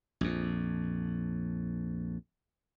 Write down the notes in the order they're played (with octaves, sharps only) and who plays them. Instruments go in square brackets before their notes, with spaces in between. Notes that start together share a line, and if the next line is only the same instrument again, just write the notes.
[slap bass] A#1 F2